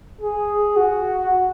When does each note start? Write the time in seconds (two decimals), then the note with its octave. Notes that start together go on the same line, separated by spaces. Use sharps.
0.21 G#4
0.76 F#4